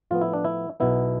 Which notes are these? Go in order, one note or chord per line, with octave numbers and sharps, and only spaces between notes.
A2 F3 B3 F4
E4
D4
E4
B1 B2 B3 E4